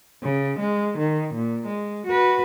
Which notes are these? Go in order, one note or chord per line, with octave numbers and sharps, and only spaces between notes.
C#3
G#3
D#3
A#2
G#3
F#4 B4